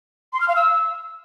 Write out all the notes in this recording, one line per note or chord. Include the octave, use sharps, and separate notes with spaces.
C6
F6
F5
E6